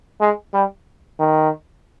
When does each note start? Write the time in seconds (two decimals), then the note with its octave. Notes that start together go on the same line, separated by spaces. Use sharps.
0.21 G#3
0.54 G3
1.19 D#3